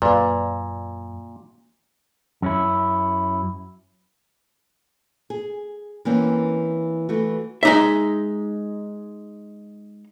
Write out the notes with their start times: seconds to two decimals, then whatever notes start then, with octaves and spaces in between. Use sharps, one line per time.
0.02 F#2 A#2 B4 D5 F5
2.42 F#2 C#4 E4
5.30 G#4
6.05 E3 A#3 C4 C#4
7.09 E3 A3 F#4
7.63 G#3 D#4 E5